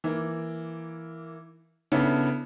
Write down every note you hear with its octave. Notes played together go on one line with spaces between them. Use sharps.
E3 A#3
C#3 B3 D4 E4 A4